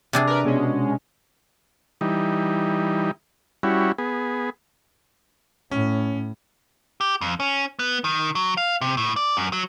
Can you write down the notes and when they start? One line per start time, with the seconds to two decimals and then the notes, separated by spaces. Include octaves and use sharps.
0.13 C3 C4 D4 G#4
0.27 A#4 B4
0.45 B2 G#3 C#4
2.01 E3 G3 D#4
3.63 G3 C#4 E4 F#4
3.98 B3 G#4
5.71 A2 C#4
7.01 G4
7.21 F2
7.40 C#4
7.79 B3
8.04 D#3
8.35 F#3
8.57 F5
8.81 C3
8.97 A2
9.16 D5
9.37 F#2
9.53 F#3